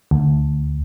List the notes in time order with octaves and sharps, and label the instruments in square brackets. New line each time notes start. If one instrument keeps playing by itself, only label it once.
[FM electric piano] D2